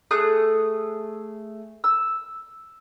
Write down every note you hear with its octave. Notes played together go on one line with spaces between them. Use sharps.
A3 G#4 D#6 F#6
E6